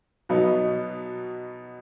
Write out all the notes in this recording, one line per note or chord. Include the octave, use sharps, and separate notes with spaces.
B2 F#3 B3 D#4